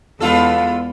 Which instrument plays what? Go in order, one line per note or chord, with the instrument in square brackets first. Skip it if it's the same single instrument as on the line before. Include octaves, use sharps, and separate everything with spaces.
[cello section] E2 G#3 [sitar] B3 F4 A4